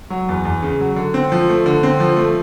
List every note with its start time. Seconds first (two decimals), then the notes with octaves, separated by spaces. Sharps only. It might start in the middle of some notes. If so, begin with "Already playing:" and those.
0.10 F#3
0.29 E2
0.45 E2
0.63 C#3
0.80 F#3
0.96 D3
1.14 C4
1.32 F3
1.49 A3
1.66 D3
1.83 C4
2.00 F3
2.17 A3